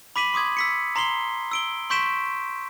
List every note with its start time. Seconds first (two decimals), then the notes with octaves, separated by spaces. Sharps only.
0.16 B5 D6 B6 D#7 F#7
0.34 C6 D6 D#6 G#6
0.57 E6 B6 C#7
0.96 A#5 C6 C7 G7
1.51 E6 D7 G7
1.90 C6 C#6 G6 B6 D7 E7